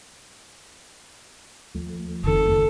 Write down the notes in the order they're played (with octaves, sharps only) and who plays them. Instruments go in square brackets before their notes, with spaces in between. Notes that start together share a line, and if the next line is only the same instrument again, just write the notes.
[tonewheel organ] D#2 F3 A3
[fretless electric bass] F#1 F2 D#3 [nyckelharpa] A4